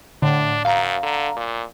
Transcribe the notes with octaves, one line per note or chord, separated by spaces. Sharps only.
A2 D3 D4
F#2 F5 A#5
D3
A#2